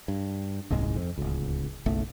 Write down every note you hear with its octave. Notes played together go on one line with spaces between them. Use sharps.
G2
D#1 C2 G#2 G#3
F2
D1 C#2
F#1 B1 A3